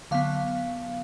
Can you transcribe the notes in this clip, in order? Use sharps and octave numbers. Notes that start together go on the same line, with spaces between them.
D3 F#3 B3 F5